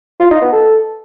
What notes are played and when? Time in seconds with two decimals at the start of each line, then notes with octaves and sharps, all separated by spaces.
0.20 F4
0.31 D#4
0.42 B3
0.52 A4